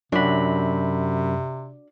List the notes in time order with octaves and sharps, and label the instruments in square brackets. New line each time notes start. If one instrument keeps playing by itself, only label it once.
[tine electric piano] F#2 B5 [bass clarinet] C3 [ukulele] D4 F#4